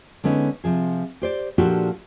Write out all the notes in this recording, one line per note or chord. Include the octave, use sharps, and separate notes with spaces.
D3 G#3 B3 C#4 D#4
C3 F3 G#4
G4 C5 D5
A#2 F3 D4 F#4 G4 A4